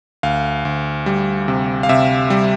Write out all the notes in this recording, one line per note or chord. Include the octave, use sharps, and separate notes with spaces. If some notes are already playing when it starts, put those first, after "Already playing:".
D2 F5
D2
G3
C3
F5
C3 E5
G3